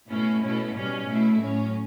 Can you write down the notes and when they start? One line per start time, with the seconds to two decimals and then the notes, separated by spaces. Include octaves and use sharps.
0.09 B2 A3 C#4 E4
0.42 B2 A3 C#4 E4
0.75 B2 G3 C#4
1.08 B2 A3 E4
1.41 A2 F#3 C#4